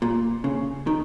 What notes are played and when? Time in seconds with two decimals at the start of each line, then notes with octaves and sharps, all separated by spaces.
0.02 A#2
0.44 C#3
0.87 D#3